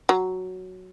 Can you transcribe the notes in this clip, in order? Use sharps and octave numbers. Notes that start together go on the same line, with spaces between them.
F#3